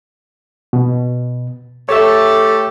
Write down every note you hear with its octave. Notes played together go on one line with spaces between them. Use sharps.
B2
A3 G4 A4 C#5 E5